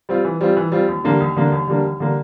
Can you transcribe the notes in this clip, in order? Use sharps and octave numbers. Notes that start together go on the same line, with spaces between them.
G3 C4 F4
E3
G3 C4 F4
E3
G3 C4 F4
D#2
D3 G3 A#3 D4
D#2
D3 G3 A#3 D4
D#2
D3 G3 A#3 D4
D#2
D3 G3 A#3 D4